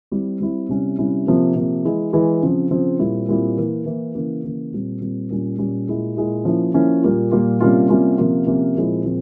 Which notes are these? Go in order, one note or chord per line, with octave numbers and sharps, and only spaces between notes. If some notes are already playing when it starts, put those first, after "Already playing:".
G3 C4 E4
G3 C4 E4
C3 G3 C#4 E4
C3 G3 C#4 E4
C3 F3 A#3
C3 F3 A#3
E3 G#3 E4
E3 G#3 E4
C#3 F3 C4
C#3 F3 C4
A#2 G3 C4 E4
A#2 G3 C4 E4
E3 A#3 E4
E3 A#3 E4
C#3 E3 A#3
C#3 E3 A#3
A#2 G3 C4
A#2 G3 C4
A#2 G3 C#4
A#2 G3 C#4
A#2 G#3 E4
A#2 G#3 E4
F3 A#3 C#4 E4
F3 A#3 C#4 E4
A#2 G3 A#3 F4
A#2 G3 A#3 F4
C3 G3 A#3 C#4 F4
C3 G3 A#3 C#4 F4
C3 F3 A#3 C#4 F4
C3 F3 A#3 C#4 F4
A#2 F3 G#3 C4 E4
A#2 F3 G#3 C4